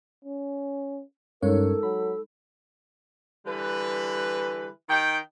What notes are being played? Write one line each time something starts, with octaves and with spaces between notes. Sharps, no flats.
C#4
G2 G#3 C#4 D#4 A4 A#4 C#5
F#3 B5
D3 E3 G3 B4
D#3 D#4 G5